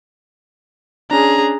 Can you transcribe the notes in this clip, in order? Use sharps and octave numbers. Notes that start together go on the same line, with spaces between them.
C#4 D4 G#4 A#5